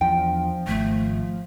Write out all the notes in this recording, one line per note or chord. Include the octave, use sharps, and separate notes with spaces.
E2 F3 D4 G5
G#1 A3